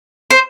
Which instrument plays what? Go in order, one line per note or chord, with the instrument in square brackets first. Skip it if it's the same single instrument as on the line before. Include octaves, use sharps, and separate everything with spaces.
[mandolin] C5